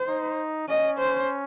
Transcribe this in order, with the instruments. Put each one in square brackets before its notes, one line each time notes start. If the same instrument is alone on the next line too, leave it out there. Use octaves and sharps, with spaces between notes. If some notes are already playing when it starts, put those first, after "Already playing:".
Already playing: [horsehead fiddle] C5
[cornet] D#4
[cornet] C#4 [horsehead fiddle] D#5
[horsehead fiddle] C5